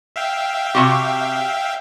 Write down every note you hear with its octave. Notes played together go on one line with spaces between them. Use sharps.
E5 F5 G5
C3 F#4 G4